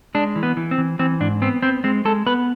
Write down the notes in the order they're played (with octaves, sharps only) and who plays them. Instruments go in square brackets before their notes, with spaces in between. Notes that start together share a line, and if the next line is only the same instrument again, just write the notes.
[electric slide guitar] G#3 D4
E3
B3
E3
C4
E3
E3 C4
G#2 D4
B3 C4
B3 C4
G#3 C4
G#3 A4
B3 B4